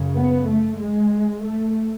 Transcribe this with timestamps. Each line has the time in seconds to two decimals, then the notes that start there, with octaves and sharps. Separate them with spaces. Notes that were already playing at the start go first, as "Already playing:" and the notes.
Already playing: F#2 C#3
0.16 B3
0.48 A3
0.80 G#3
1.43 A3